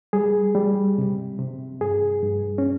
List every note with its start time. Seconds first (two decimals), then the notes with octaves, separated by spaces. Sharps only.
0.13 G3 G#4
0.55 G3
0.98 C3
1.39 C3
1.81 G2 G#4
2.23 G2
2.58 C#4